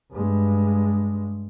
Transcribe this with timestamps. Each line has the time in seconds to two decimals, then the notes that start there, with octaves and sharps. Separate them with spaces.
0.12 G2 G#3